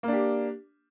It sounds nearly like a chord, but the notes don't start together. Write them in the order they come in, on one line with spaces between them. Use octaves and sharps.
A#3 D4 G4